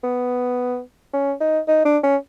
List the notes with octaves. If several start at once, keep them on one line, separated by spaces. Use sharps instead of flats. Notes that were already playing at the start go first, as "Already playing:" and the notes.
B3
C#4
D#4
D#4
D4
C#4